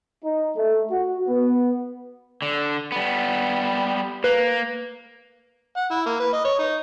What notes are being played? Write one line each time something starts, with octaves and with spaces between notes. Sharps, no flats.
D#4
A3
F#4
B3
D3
G3 B3
A#3 B4
F#5
E4
A#3
B4
D#5
C#5
D#4